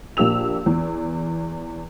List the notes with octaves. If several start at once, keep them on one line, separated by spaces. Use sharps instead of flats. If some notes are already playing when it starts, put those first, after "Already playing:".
A#1 A#3 G4 E6 F7
E2